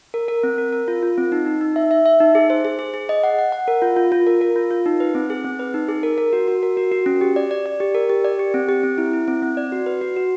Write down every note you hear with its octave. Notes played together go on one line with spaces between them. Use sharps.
A#4
A#4
C4
A#4
A#4
F4
F4
C4
D#4
D#4
D#4
E5
E5
E5
D#4
G#4
C5
G#4
G#4
G#4
D#5
F#5
F#5
F#5
A#4
F4
F4
F4
A#4
A#4
F4
F4
D#4
B4
C4
G#4
C4
B4
D#4
G#4
A#4
A#4
F#4
F#4
A#4
F#4
F#4
C#4
G4
D5
D5
D5
G4
A#4
G4
D5
G4
C4
G4
C4
E4
E4
C4
C4
D5
F#4
B4
F#4
F#4